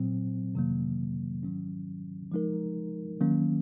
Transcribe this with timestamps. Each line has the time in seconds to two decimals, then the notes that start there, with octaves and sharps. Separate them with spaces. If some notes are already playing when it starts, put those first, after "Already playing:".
Already playing: A#2 F#3 C4
0.54 F2 C3 D#3 F#3 A#3
1.43 G#2 D#3 F#3 C#4
2.32 F3 G#3 D#4 A#4
3.21 D#3 F#3 A#3 C#4